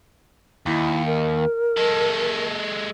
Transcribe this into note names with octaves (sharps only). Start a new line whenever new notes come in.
D#2 E4
A#4
G#3 A4